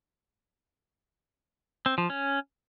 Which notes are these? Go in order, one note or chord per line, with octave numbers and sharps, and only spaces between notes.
C4
F3
C#4